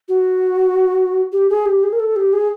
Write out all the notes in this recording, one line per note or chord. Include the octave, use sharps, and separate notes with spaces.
F#4
G4
G#4
G4
G#4
A#4
A4
G4
G#4